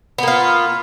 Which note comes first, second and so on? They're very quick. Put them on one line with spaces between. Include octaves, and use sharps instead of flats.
B3 A#3 F4